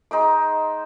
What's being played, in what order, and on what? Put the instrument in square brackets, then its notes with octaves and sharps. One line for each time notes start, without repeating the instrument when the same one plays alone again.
[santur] G#3 D#4 C5 D6